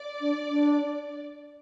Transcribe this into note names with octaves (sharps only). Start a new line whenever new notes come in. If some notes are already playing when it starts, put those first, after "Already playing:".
Already playing: D5
D4
D4